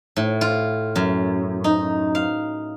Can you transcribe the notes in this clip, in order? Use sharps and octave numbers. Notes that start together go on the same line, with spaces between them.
A2
F4
F#2
D#4
F5